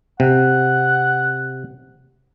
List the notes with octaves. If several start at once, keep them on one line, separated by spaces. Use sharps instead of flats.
C3 F#5